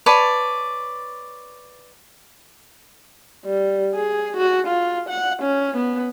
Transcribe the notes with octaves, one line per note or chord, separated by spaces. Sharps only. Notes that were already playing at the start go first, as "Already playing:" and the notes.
B4 C#5 D5 A5
G3
G#4
F#4
F4
F#5
C#4
B3